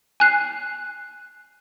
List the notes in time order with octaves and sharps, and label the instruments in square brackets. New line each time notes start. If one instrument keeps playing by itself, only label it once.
[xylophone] G#5 F#6 C7